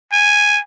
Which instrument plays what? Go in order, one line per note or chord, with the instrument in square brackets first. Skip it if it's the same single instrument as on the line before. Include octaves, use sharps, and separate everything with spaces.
[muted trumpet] G#5